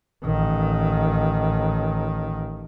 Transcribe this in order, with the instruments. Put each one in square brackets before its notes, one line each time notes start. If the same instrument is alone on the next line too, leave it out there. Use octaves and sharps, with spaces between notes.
[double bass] A1 D#3